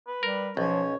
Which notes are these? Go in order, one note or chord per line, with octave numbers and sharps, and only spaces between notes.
B4
G3 A#4
B1 F3 C#4 C#5